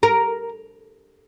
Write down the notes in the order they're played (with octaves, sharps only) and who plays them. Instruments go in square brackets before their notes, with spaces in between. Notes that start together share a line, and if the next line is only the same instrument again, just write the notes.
[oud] A#4